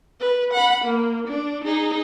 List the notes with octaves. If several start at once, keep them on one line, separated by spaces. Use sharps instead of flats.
B4
F#5 B5
A#3
D4
D#4 G#4